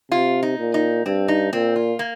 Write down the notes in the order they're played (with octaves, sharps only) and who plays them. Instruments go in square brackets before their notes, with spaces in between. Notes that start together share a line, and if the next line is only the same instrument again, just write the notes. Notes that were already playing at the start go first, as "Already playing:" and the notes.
[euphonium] C3 [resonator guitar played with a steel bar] F4
[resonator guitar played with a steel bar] D#4
[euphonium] A#2
[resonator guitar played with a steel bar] D#4
[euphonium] G2 [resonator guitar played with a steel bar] C4
[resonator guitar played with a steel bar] D#4
[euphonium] A#2 [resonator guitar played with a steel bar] C4
[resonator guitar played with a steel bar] F4
A#3